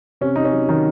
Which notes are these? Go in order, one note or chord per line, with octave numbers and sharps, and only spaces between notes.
C3 C#4
C3 D#4
C#4
F#3
D#3 F#3 D#4